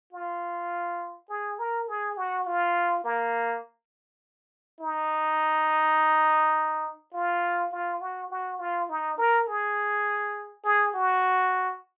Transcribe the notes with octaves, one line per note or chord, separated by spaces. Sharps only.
F4
G#4
A#4
G#4
F#4
F4
A#3
D#4
F4
F4
F#4
F#4
F4
D#4
A#4
G#4
G#4
F#4